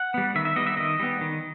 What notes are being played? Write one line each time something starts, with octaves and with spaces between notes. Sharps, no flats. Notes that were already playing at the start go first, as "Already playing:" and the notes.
Already playing: F#5
G3 B3
D#3 E5
E5
G3 B3 D#5
E5
D#3 D#5
G3 B3
D#3